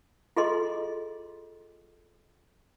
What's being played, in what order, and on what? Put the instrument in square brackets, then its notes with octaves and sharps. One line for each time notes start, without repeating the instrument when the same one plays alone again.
[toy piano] F4 G#4 A4 D#5 C6